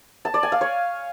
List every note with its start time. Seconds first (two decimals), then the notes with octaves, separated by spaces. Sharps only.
0.25 A5
0.34 D5
0.43 G#5
0.52 F5
0.61 C#5